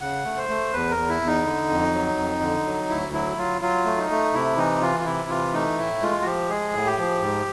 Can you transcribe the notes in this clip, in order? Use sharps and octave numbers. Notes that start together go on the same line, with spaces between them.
C#3 F#5
A3
C5
A3
E2 B4
A#4
E2
E4
E2
D#4
D3
F2
F#3
F2
D3
F#3
D2 E4
F#3 E4
F#3 F4
F#3 F4
A3
D#4
A3
C3 E4
E3 D#4
E3 F4
F4
C3 E4
E3 F4
A3 D#4
A2 E4
G#3 F4
F#4
F3 G4
G#3 G#4
A2
G4
F3
G#2